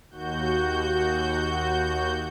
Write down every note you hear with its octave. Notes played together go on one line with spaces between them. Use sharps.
D#2 F#4 G6